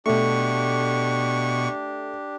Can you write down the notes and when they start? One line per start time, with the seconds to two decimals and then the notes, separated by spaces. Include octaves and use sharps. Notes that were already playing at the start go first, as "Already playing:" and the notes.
0.06 B2 A3 D4 G4 C#6